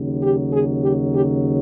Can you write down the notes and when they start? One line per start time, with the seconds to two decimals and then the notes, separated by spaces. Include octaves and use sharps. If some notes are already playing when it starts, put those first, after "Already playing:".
Already playing: D#2 C#3 F#3
0.23 G4
0.53 G#4
0.83 G4
1.13 G4